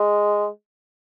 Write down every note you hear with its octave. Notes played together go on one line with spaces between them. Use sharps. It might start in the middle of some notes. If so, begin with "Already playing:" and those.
Already playing: G#3